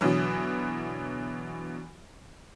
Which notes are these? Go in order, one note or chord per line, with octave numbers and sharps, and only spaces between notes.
B2 D3 E3 F#3